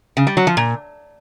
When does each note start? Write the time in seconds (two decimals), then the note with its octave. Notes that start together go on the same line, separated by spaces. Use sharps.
0.17 C#3
0.27 G3
0.37 F#3
0.47 F3
0.57 A#2